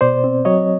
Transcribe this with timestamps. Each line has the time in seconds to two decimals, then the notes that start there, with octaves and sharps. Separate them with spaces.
0.01 B2 C5 D5
0.24 C4
0.45 F#3 C#5 D#5